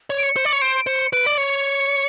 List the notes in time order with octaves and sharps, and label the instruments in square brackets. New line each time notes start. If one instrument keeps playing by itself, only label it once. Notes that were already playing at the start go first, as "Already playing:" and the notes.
[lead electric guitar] C#5
[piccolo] D7
C#7
[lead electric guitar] C5
D5
C#5
[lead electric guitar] C5 [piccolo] D7
[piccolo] D7
[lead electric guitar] C5 [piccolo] C#7
[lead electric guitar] B4 [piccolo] D7
[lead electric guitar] D5
[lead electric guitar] C#5 [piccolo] C#7